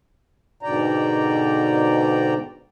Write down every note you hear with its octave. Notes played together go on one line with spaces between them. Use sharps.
G#2 B2 D3 D5 G5 A#5